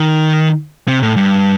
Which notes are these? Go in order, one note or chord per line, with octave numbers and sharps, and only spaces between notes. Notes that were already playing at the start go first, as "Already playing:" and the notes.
Already playing: D#3
C3
A2
G2